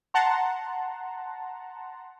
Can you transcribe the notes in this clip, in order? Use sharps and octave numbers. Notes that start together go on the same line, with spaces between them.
F#5 A5 A#5 C6